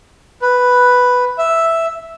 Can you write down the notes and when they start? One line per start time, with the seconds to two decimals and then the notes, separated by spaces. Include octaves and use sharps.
0.42 B4
1.38 E5